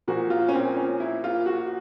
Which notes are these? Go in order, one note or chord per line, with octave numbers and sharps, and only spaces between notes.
A#2 F3 F#4
F4
C#4
C4
C#4
E4
F4
F#4